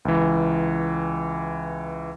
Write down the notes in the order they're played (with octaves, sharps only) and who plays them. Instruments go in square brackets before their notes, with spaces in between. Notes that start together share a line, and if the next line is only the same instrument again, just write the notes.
[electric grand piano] C#2 E3